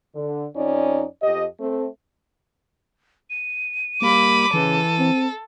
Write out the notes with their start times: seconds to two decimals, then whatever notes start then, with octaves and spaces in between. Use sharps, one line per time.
0.15 D3
0.56 F2 C#4 D#4 D5
1.23 F2 G4 D#5
1.60 A3 C4
3.30 D#7
4.02 G3 A#3 B5 D6
4.54 C#3 E3 A4
4.98 C4